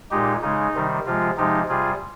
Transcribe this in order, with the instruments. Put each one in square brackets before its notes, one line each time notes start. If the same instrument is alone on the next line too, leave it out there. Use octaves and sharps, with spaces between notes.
[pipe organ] A#2 G#3 D#4 G4
C#3 G#3 D#4
C3 D#3 G3
C3 F3 G#3 F4
C3 F3 G#3 D#4 G4
C3 G3 F4 G#4